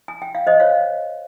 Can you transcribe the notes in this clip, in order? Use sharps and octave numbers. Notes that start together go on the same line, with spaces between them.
G#5
G5
F5
C5 D#5
C#5 F5